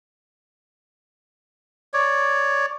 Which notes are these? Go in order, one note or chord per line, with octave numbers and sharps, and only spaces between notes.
C#5 D5